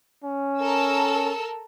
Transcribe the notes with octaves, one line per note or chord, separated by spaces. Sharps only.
C#4
A4 A#4 E6